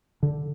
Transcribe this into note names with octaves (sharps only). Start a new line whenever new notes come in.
D3